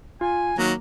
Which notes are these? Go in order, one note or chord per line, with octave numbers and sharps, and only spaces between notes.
F4 G#5
D#3 F#3 A#3 A#5